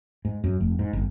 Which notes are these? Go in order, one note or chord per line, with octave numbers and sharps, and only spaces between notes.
G#2
F#2
F1
G#2
G1